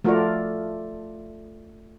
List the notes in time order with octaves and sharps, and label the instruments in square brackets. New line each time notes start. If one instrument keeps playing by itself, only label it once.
[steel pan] F3 F#4 A#4 [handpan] A3 F4 D5